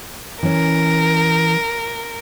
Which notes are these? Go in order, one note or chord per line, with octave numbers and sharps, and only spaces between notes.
E3 C#4 A#4